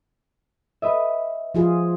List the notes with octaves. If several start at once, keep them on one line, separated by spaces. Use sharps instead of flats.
B4 D#5 E5
F3 F4 G#4